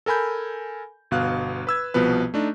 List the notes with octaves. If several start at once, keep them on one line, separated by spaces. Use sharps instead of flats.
A4 A#4 G#5 B5 G6
G1 B2 F5 F#6
B4 E6 G#6
C2 B2 F3 B3 B4
A3 D4 D#4